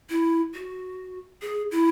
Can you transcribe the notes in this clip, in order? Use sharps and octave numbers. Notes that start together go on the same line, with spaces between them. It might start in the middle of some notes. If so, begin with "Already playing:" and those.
E4
F#4
G#4
E4